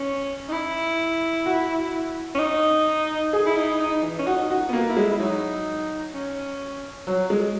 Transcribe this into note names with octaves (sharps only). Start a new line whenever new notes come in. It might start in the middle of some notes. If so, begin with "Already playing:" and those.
Already playing: C#4
D#4
E4
F#4
C#4
D#4
G#4
E4
D#4
D#4
E3
C#4
D#4 F#4
F#4
B3
A#3
E4
G#3
E4
F#3 D#4
C#4
F#3
G#3